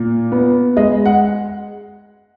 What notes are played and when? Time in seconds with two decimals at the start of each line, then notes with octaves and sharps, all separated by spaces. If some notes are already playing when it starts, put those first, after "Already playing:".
Already playing: A#2
0.32 B3
0.77 G#3 D#5
1.06 F#5